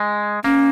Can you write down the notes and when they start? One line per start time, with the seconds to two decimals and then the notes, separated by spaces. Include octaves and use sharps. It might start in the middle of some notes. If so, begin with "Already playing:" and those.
Already playing: G#3
0.44 A#3 C#4